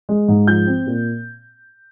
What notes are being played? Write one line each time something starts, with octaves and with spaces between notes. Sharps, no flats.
G#3
G#2
F3 G6
C4
A#2